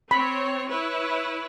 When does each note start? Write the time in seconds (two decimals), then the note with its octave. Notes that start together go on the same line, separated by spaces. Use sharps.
0.11 C4 C#5 B5
0.70 E4 B4 C#5